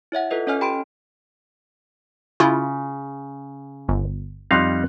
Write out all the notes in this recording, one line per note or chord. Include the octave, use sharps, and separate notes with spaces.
E4 C#5 E5 F#5
F4 A4 B4 D#5
C#4 A4 C#5 D#5 G#5 F6
G4 G5 B5 C6 D7
C#3 E4 F4
G1
F2 G3 D#4 F5 C6 F#6